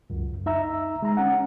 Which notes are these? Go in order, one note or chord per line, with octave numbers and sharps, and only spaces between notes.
C#2 F#2
D#4 E5 A#5 E6
G#3 A#5
C#4 F#5